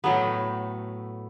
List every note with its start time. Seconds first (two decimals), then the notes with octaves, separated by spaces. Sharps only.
0.04 A2 F#3 A3 B3